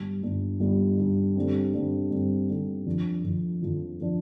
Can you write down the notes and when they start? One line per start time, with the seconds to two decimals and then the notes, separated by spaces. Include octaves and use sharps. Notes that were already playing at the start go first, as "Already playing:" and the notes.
Already playing: G1 G2 G3
0.23 G1 G2 G3
0.60 G1 G2 G3
0.98 G1 G2 G3
1.36 G2 D3 G3 C4
1.73 G2 D3 G3 C4
2.11 G2 D3 G3 C4
2.49 G2 D3 G3 C4
2.86 F2 F3 D4
3.24 F2 F3 D4
3.62 F2 F3 D4
4.01 F3 D4